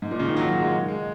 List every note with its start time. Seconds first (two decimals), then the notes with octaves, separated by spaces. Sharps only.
0.02 G#2
0.11 A#2
0.19 C#3
0.28 D#3
0.37 F#3
0.49 F#3
0.60 G#3
0.88 G#3